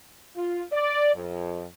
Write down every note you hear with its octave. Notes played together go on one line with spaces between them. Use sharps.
F4
D5
F2